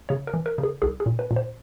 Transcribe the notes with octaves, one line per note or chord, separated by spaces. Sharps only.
C#3 C#5
A#4
E3
A#4
C#3
G#4
C2 G#4
G#4
A#2
B4
A#2
C5